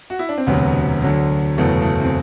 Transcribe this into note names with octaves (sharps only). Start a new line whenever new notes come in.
F#4
E4
D4
C4
E1 D2 C3 F#3 B3
D2 D3 F#3
F#1 E2 B2 F#3 A3
A3
C4